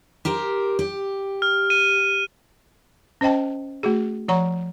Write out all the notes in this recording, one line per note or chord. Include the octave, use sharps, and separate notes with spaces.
G4 A#4 C5
G4
F6
D#7
C#4 C5 D#5 G5 A5
A3 F#4 G#4
F3 C#5 F#5 A#5 C#6